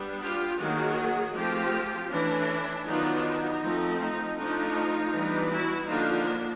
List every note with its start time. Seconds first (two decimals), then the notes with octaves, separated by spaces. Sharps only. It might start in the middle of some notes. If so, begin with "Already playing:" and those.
Already playing: G3 B3 D4
0.22 F4 G4
0.60 D#3 F#3 A#3 F#4 G#4
1.35 F3 A3 C4 F4 G4
2.11 E3 A3 C#4 D4 E4
2.86 D#3 F#3 B3 D4 D#4 F4
3.24 D#4
3.62 F3 A3 C4
4.00 D#4
4.37 F3 A3 D4 D#4 F4
5.12 E3 G3 B3 D4
5.50 E4 F#4
5.88 D3 F3 A#3 D4 D#4 F4